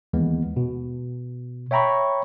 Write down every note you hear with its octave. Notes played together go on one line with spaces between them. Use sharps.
D#2 E3 G#3 B3
B2
C#5 E5 G5 A#5 B5 C#6